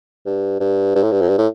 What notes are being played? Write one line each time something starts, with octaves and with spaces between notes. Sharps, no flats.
G2
G2
G2
A2
G2
F2
G2
A2